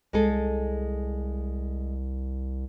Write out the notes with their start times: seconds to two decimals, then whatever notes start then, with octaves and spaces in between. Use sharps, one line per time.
0.13 C2 G#3 G#4 A4